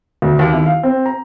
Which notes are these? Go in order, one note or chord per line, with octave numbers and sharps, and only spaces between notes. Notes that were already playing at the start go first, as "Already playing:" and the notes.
D2
D#2
E4
F5
C4
A#5